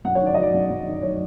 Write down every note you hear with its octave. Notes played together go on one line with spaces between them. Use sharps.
F#2 F#5
C#5
D#3
D5
F#3 D#5
D5
F#2
F#2
D#3
F#3 C#5